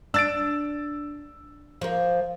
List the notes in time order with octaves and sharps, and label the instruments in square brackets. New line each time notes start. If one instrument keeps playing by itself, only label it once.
[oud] D4 [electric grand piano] E6 A6 D7
[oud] F3 A#3